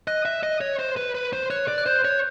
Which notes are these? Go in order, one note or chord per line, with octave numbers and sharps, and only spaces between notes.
D#5 F#6
E5
D#5
C#5
C5
B4
B4
C5
C#5 F#6
D5
F#6
C5 G6
C#5